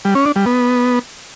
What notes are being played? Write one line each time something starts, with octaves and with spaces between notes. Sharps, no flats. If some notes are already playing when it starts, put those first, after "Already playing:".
G3
C#4
D4
G3
B3